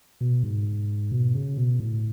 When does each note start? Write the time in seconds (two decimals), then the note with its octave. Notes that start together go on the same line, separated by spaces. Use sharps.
0.21 B2
0.44 G#2
1.12 B2
1.34 C#3
1.57 B2
1.80 A2